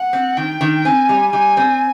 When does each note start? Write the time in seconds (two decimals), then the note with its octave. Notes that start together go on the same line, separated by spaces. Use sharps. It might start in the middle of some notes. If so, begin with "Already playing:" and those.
Already playing: F#5
0.13 C4
0.37 D#3 G5
0.61 D#3
0.85 C4 G#5
1.09 G3
1.33 G3 G#5
1.57 C4